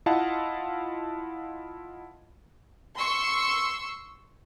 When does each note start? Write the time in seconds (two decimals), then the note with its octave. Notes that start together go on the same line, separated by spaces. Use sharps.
0.06 E4 F4 D#5 F5 F#5 A5
2.97 C6 C#6 E6